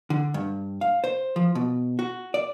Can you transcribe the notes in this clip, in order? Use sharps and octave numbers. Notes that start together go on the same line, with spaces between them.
D3
G2
F5
C5
F3
B2
F#4
D5